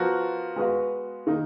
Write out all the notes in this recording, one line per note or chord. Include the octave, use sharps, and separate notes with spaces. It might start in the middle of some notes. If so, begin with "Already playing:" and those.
Already playing: F3 B3 F#4 A#4
G#3 B3 F#4 B4 F5
D#3 A#3 D#4